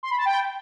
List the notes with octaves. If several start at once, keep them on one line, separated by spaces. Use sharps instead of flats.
C6
B5
A5
G5